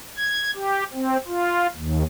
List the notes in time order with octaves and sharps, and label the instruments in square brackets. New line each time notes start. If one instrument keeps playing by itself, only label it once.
[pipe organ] G#6
G4
C4
F4
D#2